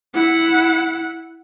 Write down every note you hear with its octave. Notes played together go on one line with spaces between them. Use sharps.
E4 F#5